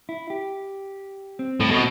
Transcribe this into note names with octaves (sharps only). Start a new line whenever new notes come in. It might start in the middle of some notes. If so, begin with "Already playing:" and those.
E4
G4
C4
A2
B2 C4